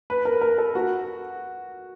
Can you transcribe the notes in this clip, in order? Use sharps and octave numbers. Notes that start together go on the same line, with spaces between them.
B4
A#4
A#4
A4
F#4